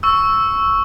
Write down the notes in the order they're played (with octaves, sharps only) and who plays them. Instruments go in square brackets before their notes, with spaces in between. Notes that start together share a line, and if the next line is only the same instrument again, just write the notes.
[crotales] C#6 E6